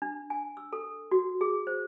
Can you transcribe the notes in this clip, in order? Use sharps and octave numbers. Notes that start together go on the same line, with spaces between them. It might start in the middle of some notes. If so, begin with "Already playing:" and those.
D4
G#5
E6
A4
F#4
G#4
C5